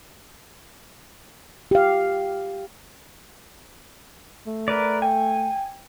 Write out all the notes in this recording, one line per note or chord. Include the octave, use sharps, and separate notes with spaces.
G4 F5
A3
A#4 B4 D5
G5 G#5